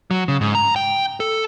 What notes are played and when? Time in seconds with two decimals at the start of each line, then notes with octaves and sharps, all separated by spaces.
0.11 F#3
0.28 C#3
0.41 G#2
0.55 A#5
0.76 G5
1.20 A4